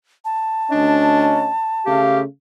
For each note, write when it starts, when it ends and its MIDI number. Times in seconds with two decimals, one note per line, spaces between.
0.25 2.01 81
0.71 1.50 38
0.71 1.50 61
0.71 1.49 62
0.71 1.50 75
1.86 2.23 49
1.86 2.23 57
1.86 2.21 67
1.86 2.23 77